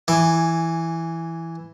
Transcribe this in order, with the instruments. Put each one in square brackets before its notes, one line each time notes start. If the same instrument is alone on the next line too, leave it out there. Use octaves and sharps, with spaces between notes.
[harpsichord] E3 G#5 D6